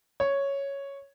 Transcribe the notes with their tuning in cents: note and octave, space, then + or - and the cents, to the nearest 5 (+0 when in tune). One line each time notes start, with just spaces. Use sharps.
C#5 +0